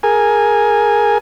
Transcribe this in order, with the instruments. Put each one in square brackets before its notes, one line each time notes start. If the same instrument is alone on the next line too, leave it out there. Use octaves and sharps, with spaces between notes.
[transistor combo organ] G#4 A#4 G#5